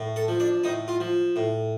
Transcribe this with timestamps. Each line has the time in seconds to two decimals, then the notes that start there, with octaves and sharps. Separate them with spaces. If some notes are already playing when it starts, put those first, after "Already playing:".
Already playing: A2
0.16 A4
0.28 F3
0.40 D4
0.64 A2 D#4
0.88 F4
1.00 F3
1.36 A2